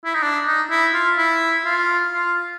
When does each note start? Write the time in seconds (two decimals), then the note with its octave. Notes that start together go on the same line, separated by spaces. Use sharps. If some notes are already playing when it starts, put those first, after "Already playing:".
0.05 E4
0.14 D#4
0.22 D4
0.46 D#4
0.70 E4
0.94 F4
1.18 E4
1.65 F4
2.12 F4